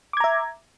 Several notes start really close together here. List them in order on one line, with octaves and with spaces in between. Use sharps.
D6 G#6 A#5 E5